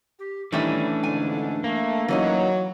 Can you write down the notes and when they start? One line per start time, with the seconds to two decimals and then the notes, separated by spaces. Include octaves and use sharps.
0.19 G4
0.52 D#3 E3 G3 A3 C#4 D4 E4
1.03 F2 G#2 D3 G#5
1.64 A3 A#3
2.08 E3 F#3 C#4 D#4